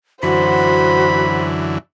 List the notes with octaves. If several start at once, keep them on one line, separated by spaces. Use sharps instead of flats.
F#2 D3 E3 F#4 C5 B5